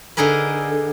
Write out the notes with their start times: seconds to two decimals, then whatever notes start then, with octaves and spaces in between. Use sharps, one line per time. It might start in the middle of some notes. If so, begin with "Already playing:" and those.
0.17 D3 D#4 G#4 A#4 B4